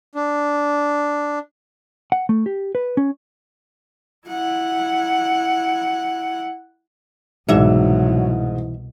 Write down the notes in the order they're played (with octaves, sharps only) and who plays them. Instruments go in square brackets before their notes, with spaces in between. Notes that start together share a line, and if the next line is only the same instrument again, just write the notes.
[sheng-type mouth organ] D4
[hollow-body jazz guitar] F#5
A3
G4
B4
C#4
[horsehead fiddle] E4 F#5
[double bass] C2 B2 [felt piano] G#2 [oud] E3 E5 [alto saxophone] F#3